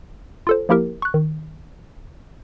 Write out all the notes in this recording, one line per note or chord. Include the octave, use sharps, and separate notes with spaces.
F4 A4 C5
F3 A#3 E4 G4 A#4
C#6 F#6
D#3